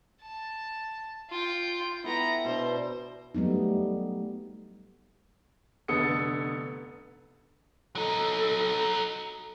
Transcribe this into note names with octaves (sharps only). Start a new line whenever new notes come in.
A5
F4 G5
B3 E4 A4 G5 A#5
B2 D4 C5 D5
F#3 G3 A3 B3 D#4
F1 D3 B3 A4 D#6 C#7
F#3 D#4 A4